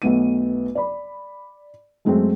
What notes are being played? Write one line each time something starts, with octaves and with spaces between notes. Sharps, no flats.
B1 A3 B3 D#7
D5 B5
F#2 G#3 A3 C4